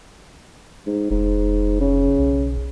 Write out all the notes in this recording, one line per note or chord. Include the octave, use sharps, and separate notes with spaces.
G#2
F1 G#2
C#3
B1